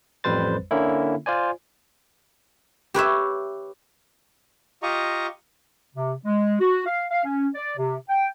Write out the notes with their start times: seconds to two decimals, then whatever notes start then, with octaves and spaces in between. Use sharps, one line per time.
0.24 A1 F2 G3 B4 C5 A6
0.71 D3 A#3 C#4 E4
1.26 F4 C5 D5 G#5
2.94 G4 B4 C#5 E5
4.83 F4 G4 D#5 A#5 C#6
5.95 C3
6.25 G#3
6.60 F#4
6.86 F5
7.11 F5
7.25 C#4
7.55 D5
7.77 C3
8.09 G5